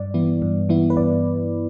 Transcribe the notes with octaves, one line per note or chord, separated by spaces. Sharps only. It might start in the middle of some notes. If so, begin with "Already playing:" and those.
Already playing: G2 D5
E3 B3 E4
G2
E3 B3 E4
B4
G2 D5